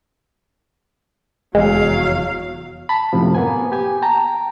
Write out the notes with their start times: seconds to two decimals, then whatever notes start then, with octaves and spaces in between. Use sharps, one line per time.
1.55 F1 E2 F#3 G#3 F5
2.89 A5 B5
3.13 F#2 A2 C3 F3
3.34 A#3 B3 G#5
3.72 G4 G#5
4.02 G5 A5 A#5